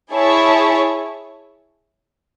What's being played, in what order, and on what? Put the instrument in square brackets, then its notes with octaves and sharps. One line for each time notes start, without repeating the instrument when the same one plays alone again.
[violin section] E4 G#4 C#5 E5 A5